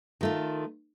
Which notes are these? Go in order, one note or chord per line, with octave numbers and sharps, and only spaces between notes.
D#3 A3 F4